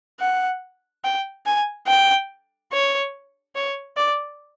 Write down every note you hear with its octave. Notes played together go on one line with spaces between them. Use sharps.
F#5
G5
G#5
G5
C#5
C#5
D5